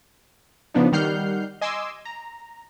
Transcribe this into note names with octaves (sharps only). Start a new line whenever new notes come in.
C#3 F3 B3 D4 D#4
D#3 G3 F#5 F6 G6 C7
D#5 G#5 C6 D6 E6
A#5